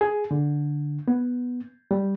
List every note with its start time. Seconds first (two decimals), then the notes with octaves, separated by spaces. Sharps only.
0.01 G#4
0.31 D3
1.08 B3
1.91 G3